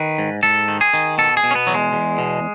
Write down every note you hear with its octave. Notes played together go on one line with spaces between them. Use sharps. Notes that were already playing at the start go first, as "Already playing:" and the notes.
Already playing: D#3 B4
G#2
G#2 A4
D#3
G#4
D#3
B2 A4
G#4
B2
C#4
B3
E2 F#3
G#3
E2
B2